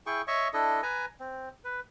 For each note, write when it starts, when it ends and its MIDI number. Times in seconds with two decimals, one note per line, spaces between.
0.06 0.22 64
0.06 0.22 68
0.06 0.22 79
0.06 0.22 85
0.28 0.48 73
0.28 0.48 75
0.28 0.48 76
0.28 0.48 85
0.53 0.81 62
0.53 0.81 64
0.53 0.81 69
0.53 0.81 75
0.83 1.06 71
0.83 1.06 80
0.83 1.06 82
1.20 1.49 60
1.64 1.80 71